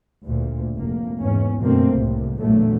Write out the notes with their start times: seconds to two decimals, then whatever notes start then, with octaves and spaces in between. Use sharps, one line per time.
0.24 D2 A#2
0.73 F1 A#3
1.20 E2 G#2 C#4
1.60 F#2 B2 D3 A3 A#3 C4
1.92 C2 A2 C3
2.39 A1 E2 A#2 D3 F#3 A3